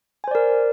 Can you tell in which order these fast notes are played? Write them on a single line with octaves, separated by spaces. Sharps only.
G#5 C5 D5 A#4